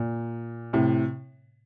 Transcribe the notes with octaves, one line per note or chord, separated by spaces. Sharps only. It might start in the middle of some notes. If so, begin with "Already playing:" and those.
Already playing: A#2
A2 C3